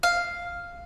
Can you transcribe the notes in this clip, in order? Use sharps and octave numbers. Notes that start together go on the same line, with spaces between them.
F5